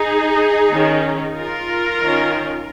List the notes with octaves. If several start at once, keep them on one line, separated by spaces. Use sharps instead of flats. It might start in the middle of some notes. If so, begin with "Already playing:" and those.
Already playing: D#4 G#4
D#3 C#4
F4 A#4
D#3 C#4